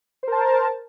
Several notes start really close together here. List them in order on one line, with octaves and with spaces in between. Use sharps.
C5 A#4 A5